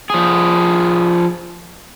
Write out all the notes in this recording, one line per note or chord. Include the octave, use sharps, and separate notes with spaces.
F3 G#4